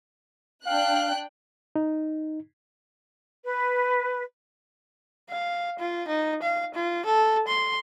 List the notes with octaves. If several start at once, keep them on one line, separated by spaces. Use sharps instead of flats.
D4 F5 G5 F#6
D#4
B4
F5
F4
D#4
F5
F4
A4
C6